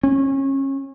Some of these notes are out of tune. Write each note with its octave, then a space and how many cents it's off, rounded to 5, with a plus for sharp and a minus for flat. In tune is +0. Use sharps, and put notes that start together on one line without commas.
C#4 -30